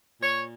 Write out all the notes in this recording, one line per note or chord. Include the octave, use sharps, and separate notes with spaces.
A#2 C#5